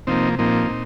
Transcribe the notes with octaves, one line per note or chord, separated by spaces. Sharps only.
C3 F3 A#3 C4 D#4
A#2 F3 A#3 C4 D#4
A#2